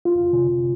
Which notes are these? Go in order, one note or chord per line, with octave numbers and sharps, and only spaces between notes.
F4
C3